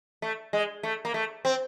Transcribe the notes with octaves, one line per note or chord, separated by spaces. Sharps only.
A3
G#3
A3
A#3
A3
C4